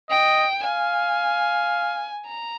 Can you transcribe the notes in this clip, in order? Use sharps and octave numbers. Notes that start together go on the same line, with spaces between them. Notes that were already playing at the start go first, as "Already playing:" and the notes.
D#5 G5
F5 G#5
A#5